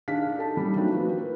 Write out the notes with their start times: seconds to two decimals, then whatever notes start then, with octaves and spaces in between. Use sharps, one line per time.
0.08 D#3 D4 G#4 F5 B6
0.36 D#4 G4 A4 A5
0.57 G3 A#3 C#4 D#4
0.76 F#3 A3 A#3 C4 D4 D#4
0.92 F3 A#3 C4 F#4 B4
1.18 A#4 B4